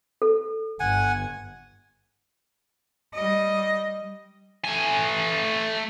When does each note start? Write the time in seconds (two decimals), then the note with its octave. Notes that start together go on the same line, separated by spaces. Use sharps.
0.22 A4
0.80 G1 F#5 G#5
3.14 G3 D#5
4.65 A3 G#5